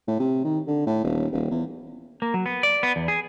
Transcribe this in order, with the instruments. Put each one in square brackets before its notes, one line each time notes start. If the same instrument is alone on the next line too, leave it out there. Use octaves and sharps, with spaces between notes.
[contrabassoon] A2
C3
D#3
D3
A2
D#1
D#1
E2
[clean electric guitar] A#3
F#3
B3
D5
B3
E2
G#4